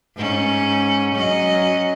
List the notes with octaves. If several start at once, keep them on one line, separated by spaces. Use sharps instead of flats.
G#2 C#4
F#3 C#4 D#5